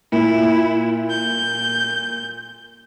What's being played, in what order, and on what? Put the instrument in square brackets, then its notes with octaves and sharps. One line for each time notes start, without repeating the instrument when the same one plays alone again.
[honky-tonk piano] A#2 [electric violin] E4
[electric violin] G6